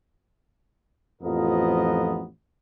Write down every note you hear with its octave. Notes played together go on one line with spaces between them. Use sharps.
A1 F2 F3 B3 A#4 D#5